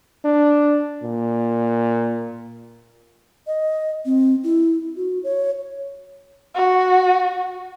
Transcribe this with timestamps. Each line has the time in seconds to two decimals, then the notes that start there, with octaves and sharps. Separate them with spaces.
0.25 D4
1.03 A#2
3.47 D#5
4.06 C4
4.44 E4
4.96 F#4
5.24 C#5
6.55 F#4